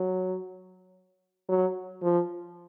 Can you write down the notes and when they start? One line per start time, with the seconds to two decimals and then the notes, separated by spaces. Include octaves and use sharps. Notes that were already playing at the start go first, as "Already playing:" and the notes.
Already playing: F#3
1.49 F#3
2.03 F3